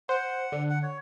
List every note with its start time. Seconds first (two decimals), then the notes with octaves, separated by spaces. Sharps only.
0.09 C5 F#5
0.52 D3
0.70 F#5
0.83 C#5